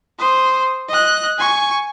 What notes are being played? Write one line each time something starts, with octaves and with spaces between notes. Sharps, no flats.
C5 D#6
D#5 F#6
G#5 C#6